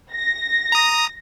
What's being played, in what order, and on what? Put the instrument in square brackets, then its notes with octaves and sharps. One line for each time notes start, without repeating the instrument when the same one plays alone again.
[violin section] A#6
[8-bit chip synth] A#5 D#6